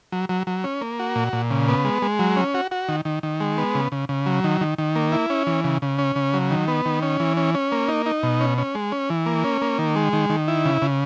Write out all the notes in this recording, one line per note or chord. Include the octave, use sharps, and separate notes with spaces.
F#3
F#3
F#3
C#4
A#3
F#4
A#2
A#2
C#3
B3
G#3
G#3
F#3
C#4
F#4
F#4
D#3
D#3
D#3
G#3
B3
C#3
C#3
C#3
F#3
D#3
D#3
D#3
A#3
E4
C#4
E3
C#3
C#3
C#4
C#3
F#3
D#3
B3
D#3
C#4
E3
C#4
C#4
A#3
D#4
D#4
B2
C#4
C#4
G#3
C#4
E3
A#3
C#4
A#3
D#3
G#3
D#3
D#3
E4
C#3
C#3